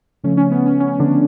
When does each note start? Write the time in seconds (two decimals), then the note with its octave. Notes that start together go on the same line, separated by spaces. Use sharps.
0.24 C#3 F3 A3 C#4
0.37 C#4
0.51 B3
0.66 C#4
0.80 C#4
0.99 D3 D4